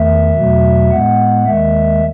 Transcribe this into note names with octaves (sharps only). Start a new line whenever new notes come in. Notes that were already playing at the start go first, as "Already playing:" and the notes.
Already playing: E2 D#3 A3 E5
E2 B2 F#3 A3
A2 G#3 B3 F#5
D#2 D#3 G#3 E5